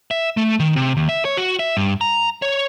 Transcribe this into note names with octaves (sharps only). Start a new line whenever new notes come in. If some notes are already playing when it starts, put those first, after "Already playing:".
E5
A3
D#3
C3
D#2
E5
C#5
F#4
E5
G2
A#5
C#5